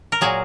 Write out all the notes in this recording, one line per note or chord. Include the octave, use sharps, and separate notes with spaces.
A#4
A#2 F#3 G#4